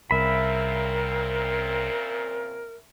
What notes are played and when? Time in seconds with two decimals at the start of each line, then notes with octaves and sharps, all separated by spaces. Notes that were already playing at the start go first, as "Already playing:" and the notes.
0.11 C2 A#2 C#3 C4 A#4 E5 B5